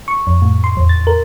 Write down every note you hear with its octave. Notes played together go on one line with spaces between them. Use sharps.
C#6
F2
A2
C6
E2
A6
A#4